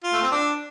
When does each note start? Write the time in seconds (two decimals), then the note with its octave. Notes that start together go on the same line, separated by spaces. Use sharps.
0.04 F4
0.13 A3
0.22 C4
0.32 D4